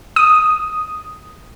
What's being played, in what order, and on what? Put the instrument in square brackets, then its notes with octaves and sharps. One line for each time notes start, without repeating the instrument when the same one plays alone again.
[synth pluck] D#6